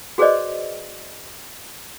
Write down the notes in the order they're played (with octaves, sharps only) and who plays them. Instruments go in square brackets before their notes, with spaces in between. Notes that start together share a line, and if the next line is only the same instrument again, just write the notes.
[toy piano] F#4 G#4 B4 C5 D5 D#5